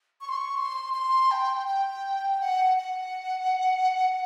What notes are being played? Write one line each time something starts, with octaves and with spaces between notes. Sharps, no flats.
C#6
C6
C#6
C6
C6
G5
G5
F#5
F#5